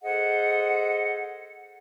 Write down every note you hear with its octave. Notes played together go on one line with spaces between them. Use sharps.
G#4 A4 C5 D#5 F#5